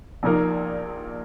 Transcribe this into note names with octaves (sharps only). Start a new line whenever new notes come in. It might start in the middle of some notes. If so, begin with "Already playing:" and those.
A#1 A#2 A#3 D#4 A#4